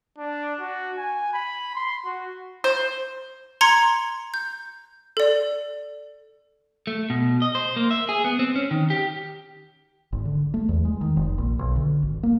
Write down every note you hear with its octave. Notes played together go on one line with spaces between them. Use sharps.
D4
F#4
G#5
B5
C6
F#4
C5
A#5 C6 G#6 C#7
G6
A4 D5
A3
B2
D#5
C5
A#3
E5
G#4
B3
C4
C#4
D#3
G4
G#1
D3
A3
E2
G#3
D#3
F1
A#1
B1
D3
G#1
A#3